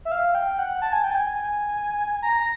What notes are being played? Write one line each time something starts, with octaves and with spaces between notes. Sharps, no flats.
E5
F5
G5
F#5
A5
G#5
G5
G#5
A#5
A#5